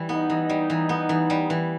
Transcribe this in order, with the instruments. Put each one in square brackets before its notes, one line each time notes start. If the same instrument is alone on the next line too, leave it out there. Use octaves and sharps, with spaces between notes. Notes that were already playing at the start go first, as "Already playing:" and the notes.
Already playing: [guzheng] E3 G3
[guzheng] B3 [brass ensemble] D#4
[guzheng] E3
G3
E3
B3
E3
G3
E3